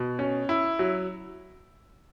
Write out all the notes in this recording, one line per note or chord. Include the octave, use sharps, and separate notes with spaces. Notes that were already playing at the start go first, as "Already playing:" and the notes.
Already playing: B2
C#4
E4
F#3